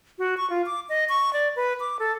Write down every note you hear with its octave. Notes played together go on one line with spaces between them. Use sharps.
F#4
C#6
F4
D6
D#5
C#6
D5
B4
D6
A4